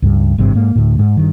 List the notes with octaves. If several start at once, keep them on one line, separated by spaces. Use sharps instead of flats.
C#2 G2
G#1 G2 C3 C4
G#2 A#3
D2 A2
G#2
G2 D#3